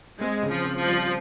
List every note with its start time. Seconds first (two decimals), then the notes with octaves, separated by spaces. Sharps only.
0.21 G#3 C4
0.43 C#3
0.51 F3
0.64 C4
0.79 F3
0.87 G3